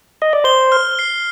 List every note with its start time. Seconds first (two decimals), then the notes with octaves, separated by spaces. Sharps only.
0.22 D#5
0.33 D5
0.44 C5 G7
0.72 F6
0.99 C7